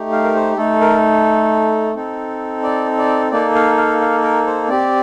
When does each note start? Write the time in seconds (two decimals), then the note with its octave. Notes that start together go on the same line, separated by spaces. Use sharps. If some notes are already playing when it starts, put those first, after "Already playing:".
Already playing: A3 D#4 G4
0.12 F5
0.23 A#4
0.35 C5
0.57 A3 D#4 A4
0.81 A#4
1.95 C4 D#4 A4
2.63 D5
2.98 D5
3.32 A#3 D#4 A4 D5
3.55 F5
3.77 F5
4.01 F5
4.23 A#4
4.47 C5
4.69 C4 G4 D5